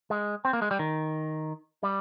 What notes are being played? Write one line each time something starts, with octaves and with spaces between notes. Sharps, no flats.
G#3
C4
A#3
G#3
G3
D#3
G3